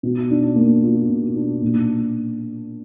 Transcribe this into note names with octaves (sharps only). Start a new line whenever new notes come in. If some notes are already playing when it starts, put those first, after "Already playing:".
B2
D4
A#3
F4
B2
D4
A#2